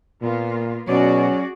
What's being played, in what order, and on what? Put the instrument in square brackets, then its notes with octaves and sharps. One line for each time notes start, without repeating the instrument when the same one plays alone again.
[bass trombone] A#2 [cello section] A#3 B3 F4
[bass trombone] B2 [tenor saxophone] F#3 [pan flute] C#4 [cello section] F#4 G#4 D5